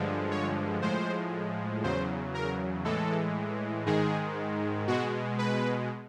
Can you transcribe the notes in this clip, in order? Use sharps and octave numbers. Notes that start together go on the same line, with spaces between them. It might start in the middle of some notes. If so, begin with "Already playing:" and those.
Already playing: G2 D3 F3 G#3
C#5
A2 F3 G#3 C5
E2 C#3 F#3 C5
A#4
A2 E3 G#3 A4
G#2 D#3 G#3 G#4
B2 G#3 F#4
B4